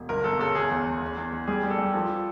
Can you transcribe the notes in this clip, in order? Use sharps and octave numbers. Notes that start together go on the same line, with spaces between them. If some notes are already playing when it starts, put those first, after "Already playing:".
Already playing: E1
G1 A#4
G1 A4
C#3 A4
E2 G#4
E2
E2
E2
E2
E2
G3 G#4
G3
A4
G3
F3 A4
F3